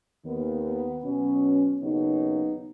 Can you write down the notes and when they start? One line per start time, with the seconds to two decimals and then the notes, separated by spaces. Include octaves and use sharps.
0.25 D#2 D#3 B3
0.63 B3
1.03 B2 F#3 B3 C#4
1.82 D#2 C#3 F#3 B3 D#4